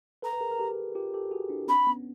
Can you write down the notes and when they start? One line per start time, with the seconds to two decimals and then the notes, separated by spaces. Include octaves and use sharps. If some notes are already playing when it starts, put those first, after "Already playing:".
0.22 A4 B4 A#5
0.33 B4
0.41 G#4 A#4
0.51 A#4
0.59 G4 A4
0.95 F4 G4
1.14 G4 A4
1.31 F#4 G#4
1.49 D4 E4
1.68 C4 D4 B5
1.87 B3 C#4